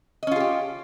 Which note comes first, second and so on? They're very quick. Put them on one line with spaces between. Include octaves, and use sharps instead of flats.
D#5 C#4 F4 G#4 G4